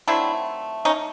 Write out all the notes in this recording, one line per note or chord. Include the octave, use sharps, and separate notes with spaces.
D#3 F#3 A3 C4 D4 E4
C#4 D#4